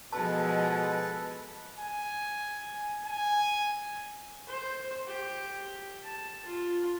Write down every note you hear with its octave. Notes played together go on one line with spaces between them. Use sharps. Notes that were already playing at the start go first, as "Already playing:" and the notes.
B2 F3 G#3 A4 B4 A5
G#5
G#5
C5
G4
A5
F4